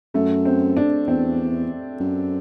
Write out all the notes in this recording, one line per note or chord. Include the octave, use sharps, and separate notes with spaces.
F#2 A3
C4
D4
E2 C4
F#2